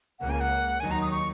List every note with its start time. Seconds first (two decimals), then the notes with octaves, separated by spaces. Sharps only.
0.19 C#2 C#3 A#3 F#5
0.30 G#5
0.40 F#5
0.80 D#2 D#3 F#3 D#4 G#5
0.91 A#5
1.01 D#6
1.11 C#6